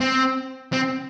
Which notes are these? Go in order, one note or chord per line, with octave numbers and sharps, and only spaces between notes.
C4
C4